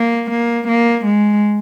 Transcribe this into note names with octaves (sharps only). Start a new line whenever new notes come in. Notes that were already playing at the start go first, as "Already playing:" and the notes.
Already playing: A#3
A#3
A#3
G#3